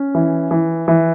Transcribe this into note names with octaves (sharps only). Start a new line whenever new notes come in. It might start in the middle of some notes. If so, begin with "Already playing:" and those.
Already playing: C#4
E3
E3
E3